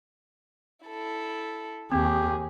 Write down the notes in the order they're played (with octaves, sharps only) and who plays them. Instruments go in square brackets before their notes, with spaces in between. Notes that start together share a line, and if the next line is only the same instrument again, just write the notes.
[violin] E4 A4
[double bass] D#2 [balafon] C4 [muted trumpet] G4 [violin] G#4